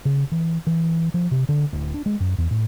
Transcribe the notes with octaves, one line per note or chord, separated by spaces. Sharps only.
C#3
E3
E3
F3
C3
D3
D1
D4
G#3
F#2
E2
A2